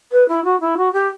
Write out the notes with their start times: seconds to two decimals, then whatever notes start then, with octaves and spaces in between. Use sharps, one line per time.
0.12 B4
0.28 E4
0.44 F#4
0.60 E4
0.77 F#4
0.93 G4